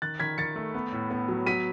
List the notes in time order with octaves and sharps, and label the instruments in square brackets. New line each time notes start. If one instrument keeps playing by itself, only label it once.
[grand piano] D#3 F#6 A6
D#3 G#6 B6
D#3 A6 C#7
A3
B3
A2
B3
F#3
F#3 B6 D#7